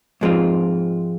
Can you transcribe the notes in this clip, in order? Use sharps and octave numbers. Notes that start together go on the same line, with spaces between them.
G#2 F3 G#3 C4 F4